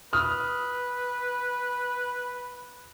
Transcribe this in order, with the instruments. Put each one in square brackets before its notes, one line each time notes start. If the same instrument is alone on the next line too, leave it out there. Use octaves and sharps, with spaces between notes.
[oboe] B4 [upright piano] D#6 F6